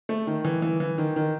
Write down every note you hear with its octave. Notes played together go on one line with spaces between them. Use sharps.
A3
D#3
E3
E3
E3
D#3
D#3